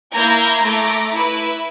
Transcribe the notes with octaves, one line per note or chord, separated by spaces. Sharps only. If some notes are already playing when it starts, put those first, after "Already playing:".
A#3 E4 A#5 G6 G#6
A3 A#5 D6
E4 B4